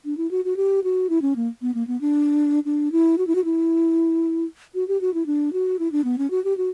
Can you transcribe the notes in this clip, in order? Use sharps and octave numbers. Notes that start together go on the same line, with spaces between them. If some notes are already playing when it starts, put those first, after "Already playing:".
D4
E4
F#4
F#4
G4
F#4
E4
C#4
A#3
B3
A#3
B3
D4
D4
E4
F#4
E4
F#4
E4
F#4
G4
F#4
E4
D4
F#4
E4
D4
B3
C#4
F#4
G4
F#4